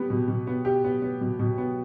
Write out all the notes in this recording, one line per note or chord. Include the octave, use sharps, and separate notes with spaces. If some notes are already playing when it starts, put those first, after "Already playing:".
Already playing: B3 G4
B2
B2
B3
G4
B3
B3
B2
B2
B3